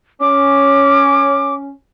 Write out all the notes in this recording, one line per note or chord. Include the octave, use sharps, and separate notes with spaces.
C#4 D6